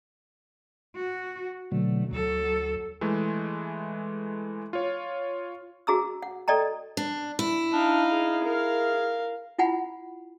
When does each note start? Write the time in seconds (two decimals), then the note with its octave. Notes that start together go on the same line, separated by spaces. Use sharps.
0.96 F#4
1.72 B2 D3 F#3 A3
2.11 D2 F#3 A4
3.01 E3 G#3 A3
4.73 F4 C#5
5.87 F#4 G#4 A#5 E6
6.23 F#5
6.48 A4 D5 D#5 G5 A#5
6.97 D4
7.39 E4
7.73 D4 D#4 F5
8.12 G#4
8.44 A#4 F5
9.58 E4 F4 F#5 G#5 B5